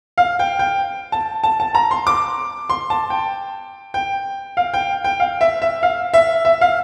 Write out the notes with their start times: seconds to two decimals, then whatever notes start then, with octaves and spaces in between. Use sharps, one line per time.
0.18 F5
0.39 G5
0.59 G5
1.12 A5
1.44 A5
1.60 A5
1.75 A#5
1.91 C6
2.07 D6
2.70 C6
2.90 A5
3.10 G5
3.94 G5
4.57 F5
4.74 G5
5.04 G5
5.20 F5
5.41 E5
5.62 E5
5.83 F5
6.14 E5
6.45 E5
6.61 F5